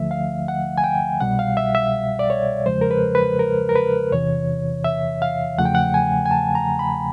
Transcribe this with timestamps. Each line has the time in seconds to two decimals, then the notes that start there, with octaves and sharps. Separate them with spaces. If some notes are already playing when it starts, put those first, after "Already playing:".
Already playing: D2 D3 F3 A3 E5
0.11 F5
0.48 F#5
0.78 G#5
0.84 G5
1.21 C2 B2 G3 F#5
1.39 F5
1.57 E5
1.75 E5
2.19 D5
2.30 C#5
2.66 E2 C#3 F3 G#3 C5
2.81 A#4
2.91 B4
3.15 B4
3.39 A#4
3.69 A#4
3.76 B4
4.12 E2 C3 E3 C#5
4.84 E5
5.22 F5
5.58 E2 C#3 F3 A3 F#5
5.65 G5
5.75 F#5
5.94 G#5
6.26 G#5
6.31 A5
6.55 A#5
6.79 B5